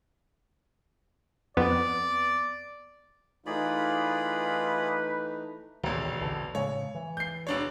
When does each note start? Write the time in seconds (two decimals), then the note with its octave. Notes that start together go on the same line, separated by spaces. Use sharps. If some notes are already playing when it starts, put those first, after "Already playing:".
1.57 F2 B3 D5
3.46 E3 A3 D#4 F4 G#4 B4 D5 B5
5.84 E1 A1 D2 C3 D#3
6.21 A#1 D3 E3
6.55 A2 C#3 G#3 C#5
6.95 E3
7.17 G6 C7
7.47 E1 D4 C#5